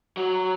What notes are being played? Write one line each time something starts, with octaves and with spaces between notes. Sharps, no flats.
F#3